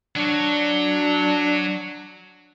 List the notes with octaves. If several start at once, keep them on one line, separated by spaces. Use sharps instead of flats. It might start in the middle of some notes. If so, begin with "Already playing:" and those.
F#3 D4